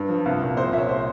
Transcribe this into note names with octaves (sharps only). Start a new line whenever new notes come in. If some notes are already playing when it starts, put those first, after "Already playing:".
Already playing: G2
F3
C2 F5
A#2
C2 C5
A#2 E5
C#5
C5